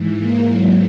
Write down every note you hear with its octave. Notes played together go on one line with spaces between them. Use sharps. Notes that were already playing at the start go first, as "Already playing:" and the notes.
Already playing: G#2 E3
A#3
F#3